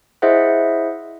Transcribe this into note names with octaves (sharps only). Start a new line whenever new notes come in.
E4 G#4 C5 D#5 E5 F#5